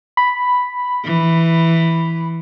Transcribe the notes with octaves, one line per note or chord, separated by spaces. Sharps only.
B5
E3